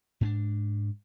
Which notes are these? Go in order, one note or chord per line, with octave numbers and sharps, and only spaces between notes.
G#2 C#4 D4